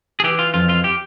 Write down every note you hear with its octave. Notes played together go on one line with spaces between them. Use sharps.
G#4
E3 G4
F4
F2 F4
F4
G4